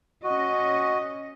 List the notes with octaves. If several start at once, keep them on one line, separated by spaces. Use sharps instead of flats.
C#4 F#4 D#5